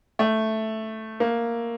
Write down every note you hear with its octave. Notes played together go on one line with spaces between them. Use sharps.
A3
A#3